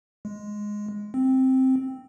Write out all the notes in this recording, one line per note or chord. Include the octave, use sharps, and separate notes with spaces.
G#3
C4